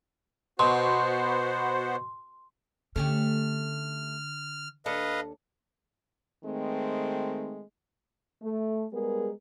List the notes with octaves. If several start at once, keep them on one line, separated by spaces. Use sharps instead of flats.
B2 B3 F#4 C5 C6
D3 A3 C#4 G4 F6
D#2 D4 A4 B4 D#5 F5
D#3 G#3 A3 C4
A3
G3 G#3 B3 G#4 A#4